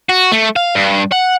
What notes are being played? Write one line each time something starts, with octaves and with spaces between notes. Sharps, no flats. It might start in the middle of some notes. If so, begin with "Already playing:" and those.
F#4
A3
F5
G2
F#5